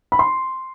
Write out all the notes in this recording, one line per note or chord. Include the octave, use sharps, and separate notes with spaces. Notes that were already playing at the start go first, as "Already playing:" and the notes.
B5
C6